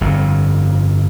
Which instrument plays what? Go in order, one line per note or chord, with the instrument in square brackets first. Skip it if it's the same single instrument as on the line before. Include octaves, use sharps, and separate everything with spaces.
[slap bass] G1 F2